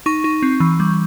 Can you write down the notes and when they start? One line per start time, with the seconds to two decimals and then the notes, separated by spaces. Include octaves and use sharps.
0.06 D#4 C#6
0.24 D#4
0.42 C4
0.60 E3
0.80 G3